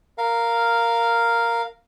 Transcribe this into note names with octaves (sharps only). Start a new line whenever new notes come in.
A#4 F5